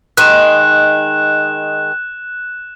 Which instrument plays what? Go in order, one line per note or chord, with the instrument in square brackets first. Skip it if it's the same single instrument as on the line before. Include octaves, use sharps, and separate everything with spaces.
[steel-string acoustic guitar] D#3 G#3 [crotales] F#6 E7